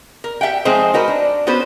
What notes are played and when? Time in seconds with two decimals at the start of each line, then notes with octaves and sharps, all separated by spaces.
0.24 A#4
0.41 G4 E5 F#5 G5
0.65 F3 G#3 C4 D#4 G#4 C5
0.94 D#4 F#4 A#4 B4
1.08 D4
1.47 B3 C#4 F#4 B4 C5